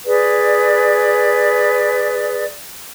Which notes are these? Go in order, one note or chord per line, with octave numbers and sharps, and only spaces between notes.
G#4 B4 D5